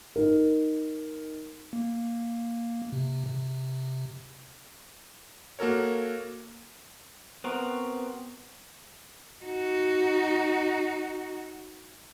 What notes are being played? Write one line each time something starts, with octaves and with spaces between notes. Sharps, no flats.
D#4 A#4
A#3
C3
C3
A#3 F#4 A4 A#4 C#5
B3 C4 F#4 A#4
D#4 F#4